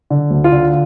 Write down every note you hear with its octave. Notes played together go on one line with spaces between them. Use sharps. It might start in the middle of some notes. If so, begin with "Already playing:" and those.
D3
D2
F4
D3